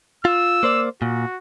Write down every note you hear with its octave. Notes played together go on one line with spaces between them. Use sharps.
F4 E6
A#3 C5 D5
A#2 F#4